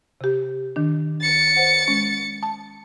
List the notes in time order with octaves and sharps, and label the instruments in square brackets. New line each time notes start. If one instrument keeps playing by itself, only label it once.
[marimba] C3 G4
D#3 D4
[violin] A6 C#7
[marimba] C5 F#5
G#3 C#4
A5